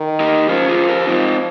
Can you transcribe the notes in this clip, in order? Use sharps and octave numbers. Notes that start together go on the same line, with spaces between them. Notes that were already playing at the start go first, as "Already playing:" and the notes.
Already playing: D#3
D#4 G4
F3 C#4 F4
F4 G#4
G4 A#4
F3 C4 D#4